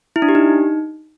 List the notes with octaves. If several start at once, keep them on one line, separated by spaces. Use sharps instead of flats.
E4
D4
G4
D#4